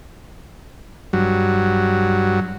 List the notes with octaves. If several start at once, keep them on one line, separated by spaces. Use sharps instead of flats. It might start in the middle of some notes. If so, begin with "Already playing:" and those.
G2 F#3